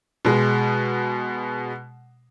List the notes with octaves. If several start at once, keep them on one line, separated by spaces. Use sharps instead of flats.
B2 G#3